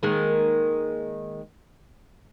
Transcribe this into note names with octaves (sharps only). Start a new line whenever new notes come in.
D#3 G#3 A#3